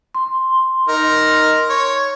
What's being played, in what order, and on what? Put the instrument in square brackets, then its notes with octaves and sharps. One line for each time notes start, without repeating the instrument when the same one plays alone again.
[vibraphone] C6
[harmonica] D#4 A#4
C#5